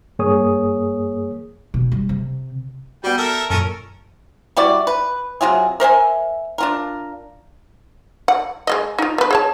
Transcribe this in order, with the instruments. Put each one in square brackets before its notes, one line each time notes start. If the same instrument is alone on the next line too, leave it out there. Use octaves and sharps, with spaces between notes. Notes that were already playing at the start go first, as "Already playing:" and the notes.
[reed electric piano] G2 A#3 G#4 C#5 D#6
[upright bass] B2
G3
C3
[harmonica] G3 G5 [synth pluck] B3 F#4
[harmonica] A4 A#4 E5
[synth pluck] F#2 A#2 [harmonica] C#4 A4 A#4
[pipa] G3 E4 F#4 D5
B4
C3 F#3 F4 G#4
A#4 C5 E5 G#5
D4 F4 A#4
[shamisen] F#5
G#3 B3 D#5
D#4 F4
B3 B4
G#4 C#5 A5